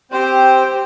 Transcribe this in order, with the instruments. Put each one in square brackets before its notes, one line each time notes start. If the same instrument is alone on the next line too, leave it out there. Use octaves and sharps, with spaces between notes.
[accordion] C4 C5 [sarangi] G4